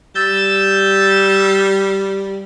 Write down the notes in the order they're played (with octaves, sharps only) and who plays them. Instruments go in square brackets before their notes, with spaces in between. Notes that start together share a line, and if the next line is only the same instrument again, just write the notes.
[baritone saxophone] G3 [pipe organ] E6 G6 A6